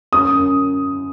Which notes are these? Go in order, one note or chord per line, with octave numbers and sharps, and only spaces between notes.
F#2 D#6
F#2